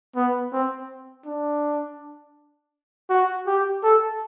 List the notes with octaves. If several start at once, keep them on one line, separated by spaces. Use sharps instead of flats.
B3
C4
D4
F#4
G4
A4